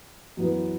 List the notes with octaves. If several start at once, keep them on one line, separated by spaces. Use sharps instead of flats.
F#2 E3 B3